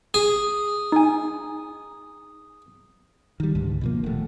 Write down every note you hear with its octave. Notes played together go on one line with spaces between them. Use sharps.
G#4
D#4 G#5
D#3 G3
C#2 G#2 D3
B2 F3 A#3
D#1 A3